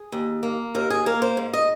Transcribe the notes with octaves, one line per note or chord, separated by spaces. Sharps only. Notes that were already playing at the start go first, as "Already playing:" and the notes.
Already playing: G#4
D#2
A#3
D#2 A#4
G#4
A#3 A#4
C5
G#2
D#5